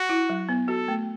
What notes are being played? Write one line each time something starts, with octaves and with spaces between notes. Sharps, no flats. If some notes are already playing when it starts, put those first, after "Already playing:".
Already playing: F#4
E4
F#3
B3
F#4 A4
A3